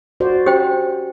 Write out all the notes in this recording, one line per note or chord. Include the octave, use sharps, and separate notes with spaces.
F#4 C5 D5
C#4 G4 C5 G5